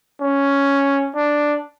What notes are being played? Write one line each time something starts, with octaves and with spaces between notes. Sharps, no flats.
C#4
D4